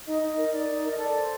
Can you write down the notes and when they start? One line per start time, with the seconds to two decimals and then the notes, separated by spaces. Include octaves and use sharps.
0.06 D#4 D#5
0.22 D#4
0.30 D#5
0.38 A#4
0.53 D#4 D5
0.69 D#4
0.84 A#4
0.90 D#5
0.99 A4 D5
1.15 C5